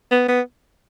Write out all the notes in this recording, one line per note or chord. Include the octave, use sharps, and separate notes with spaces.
B3
B3